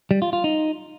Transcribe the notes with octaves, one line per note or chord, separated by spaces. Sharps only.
G3
F4
F4
D#4